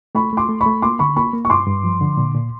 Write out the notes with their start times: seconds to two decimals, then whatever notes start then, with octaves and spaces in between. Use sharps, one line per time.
0.15 A3 B5 C#6
0.33 A3 C6 D6
0.49 A3
0.61 B5 C#6
0.66 A3
0.82 A#3 C6 D6
0.99 D3 B5 C#6
1.16 A#3 B5 C#6
1.33 A#3
1.45 C#6
1.50 G2 C6 D6
1.67 G2
1.84 F3
2.01 D3
2.17 A#2
2.35 A#2